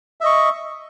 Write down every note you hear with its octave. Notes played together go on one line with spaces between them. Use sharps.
D#5 E5 C#6